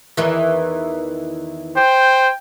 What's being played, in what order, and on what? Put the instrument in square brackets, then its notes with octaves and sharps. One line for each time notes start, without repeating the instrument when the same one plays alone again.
[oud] E2 D#3 E3
[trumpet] C5 [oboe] G5